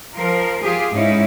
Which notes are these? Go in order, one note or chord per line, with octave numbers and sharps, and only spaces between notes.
F3 A#4
F4 G4 G#4
G#2 C#4 D#4 E4